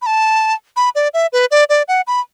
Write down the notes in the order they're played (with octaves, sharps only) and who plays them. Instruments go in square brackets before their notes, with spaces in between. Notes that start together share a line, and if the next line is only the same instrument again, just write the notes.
[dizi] B5
A5
B5
D5
E5
B4
D5
D5
F#5
B5